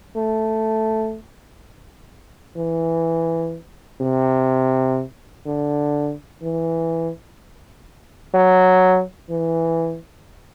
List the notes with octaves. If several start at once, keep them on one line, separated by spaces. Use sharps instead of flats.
A3
E3
C3
D3
E3
F#3
E3